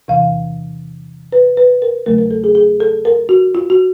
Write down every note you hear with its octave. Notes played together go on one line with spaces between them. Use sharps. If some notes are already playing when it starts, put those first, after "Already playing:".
E2 C3 E3 F5
B4
B4
A#4
E2 C#3 F#3 A3 A#4
A#4
A4
G#4
G#4
A4
A#4
F#4
F4
F#4